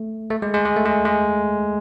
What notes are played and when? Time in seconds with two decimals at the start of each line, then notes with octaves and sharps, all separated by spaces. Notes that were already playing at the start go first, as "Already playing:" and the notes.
Already playing: A3
0.30 A3
0.42 G#3
0.54 G#3
0.65 G#3
0.76 A3
0.86 G#3
1.05 G#3